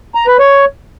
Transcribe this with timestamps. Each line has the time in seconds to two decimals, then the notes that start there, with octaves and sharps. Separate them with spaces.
0.15 A#5
0.27 B4
0.39 C#5